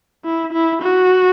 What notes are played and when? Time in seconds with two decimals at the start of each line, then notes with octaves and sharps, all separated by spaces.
0.25 E4
0.53 E4
0.82 F#4